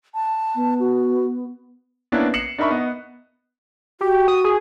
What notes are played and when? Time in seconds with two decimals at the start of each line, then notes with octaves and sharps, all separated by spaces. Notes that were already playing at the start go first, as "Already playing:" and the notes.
0.14 A5
0.54 B3
0.79 F#4
2.12 A#3 B3 C#4 D4 E4 B4
2.34 C7 C#7 E7 F#7
2.58 D4 D#4 A#4 E5 B5 C#6
2.70 B3 D#5
4.01 F#4 G4
4.28 D#6
4.45 G#4